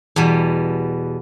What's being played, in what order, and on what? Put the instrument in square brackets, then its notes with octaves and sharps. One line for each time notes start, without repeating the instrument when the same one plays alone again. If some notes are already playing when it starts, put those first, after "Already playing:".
[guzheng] E2 B2 G3